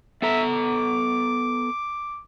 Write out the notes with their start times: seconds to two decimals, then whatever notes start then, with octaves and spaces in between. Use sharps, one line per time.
0.22 B3 A4 E5 A#5
0.51 D6